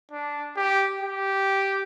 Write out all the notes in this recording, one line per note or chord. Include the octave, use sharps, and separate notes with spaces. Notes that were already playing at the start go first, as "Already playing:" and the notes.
D4
G4
G4